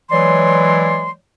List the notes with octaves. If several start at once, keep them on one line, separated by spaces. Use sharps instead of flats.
E3 F#3 G#3 C#5 D5 C6